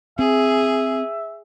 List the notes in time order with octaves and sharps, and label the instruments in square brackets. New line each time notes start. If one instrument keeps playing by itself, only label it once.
[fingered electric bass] C4 [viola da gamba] G#4 [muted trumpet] E5